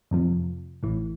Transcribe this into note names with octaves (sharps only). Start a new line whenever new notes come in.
F2 C3 F3
A1 A2 E3